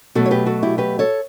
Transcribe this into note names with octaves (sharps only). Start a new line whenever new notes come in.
B2 F#3 A3 F#4 A4
C#5
G4 B4
F#4 A4
E4 G4
G4 B4
A4 C#5